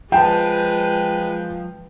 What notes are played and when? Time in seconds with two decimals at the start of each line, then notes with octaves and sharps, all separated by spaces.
0.12 F3 G#3 B4 G5 A5